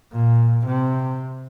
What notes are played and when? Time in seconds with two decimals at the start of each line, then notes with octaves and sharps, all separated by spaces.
0.13 A#2
0.67 C3